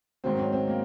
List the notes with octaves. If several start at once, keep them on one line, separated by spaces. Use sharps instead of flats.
G#2 D#3 F#3 C4
C#4
C4
A#3